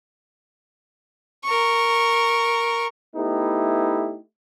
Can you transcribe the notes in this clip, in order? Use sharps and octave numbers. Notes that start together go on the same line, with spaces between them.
A#4 C#6
A3 B3 D#4 E4 G4